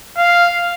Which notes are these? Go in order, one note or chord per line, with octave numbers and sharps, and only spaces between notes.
F5